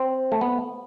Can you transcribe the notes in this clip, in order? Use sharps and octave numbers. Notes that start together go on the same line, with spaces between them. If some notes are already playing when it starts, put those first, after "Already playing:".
Already playing: C4
A3
B3